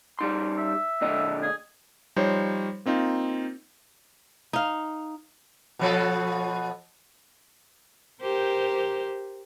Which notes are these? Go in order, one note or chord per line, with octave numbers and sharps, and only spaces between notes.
G3 D#4 C6
E5
A#2 D3 D#5
G#4
F3 G3 D#4 C5 C#5
A#3 C4 D#4 F4
D#4 F5
B2 F3 A4
G4 A#4 C5